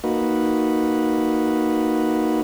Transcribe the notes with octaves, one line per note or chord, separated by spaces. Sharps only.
A#3 D#4 F#4 B4